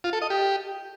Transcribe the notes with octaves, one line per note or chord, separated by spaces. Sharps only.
F4
A4
D#5
G4